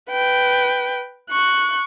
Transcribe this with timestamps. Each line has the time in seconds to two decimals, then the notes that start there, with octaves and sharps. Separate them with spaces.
0.10 B4 G5
1.30 C#6 F#6